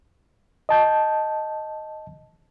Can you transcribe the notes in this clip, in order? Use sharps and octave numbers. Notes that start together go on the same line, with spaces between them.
D#5 A5 G6